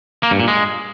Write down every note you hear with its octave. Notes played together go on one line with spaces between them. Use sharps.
A#3
G2
A#2
G#3